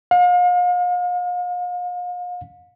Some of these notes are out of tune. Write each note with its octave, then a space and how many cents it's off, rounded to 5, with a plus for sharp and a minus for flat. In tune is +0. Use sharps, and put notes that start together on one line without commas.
F5 +40